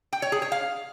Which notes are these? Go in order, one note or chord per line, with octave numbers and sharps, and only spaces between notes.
G5
C#5
G#4
C#5
F5